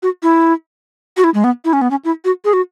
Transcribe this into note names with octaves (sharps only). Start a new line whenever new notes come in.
F#4
E4
F#4
E4
G#3
B3
E4
C#4
B3
C#4
E4
F#4
G#4
F#4